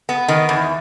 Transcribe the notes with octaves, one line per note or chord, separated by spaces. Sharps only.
B3
D#3
E2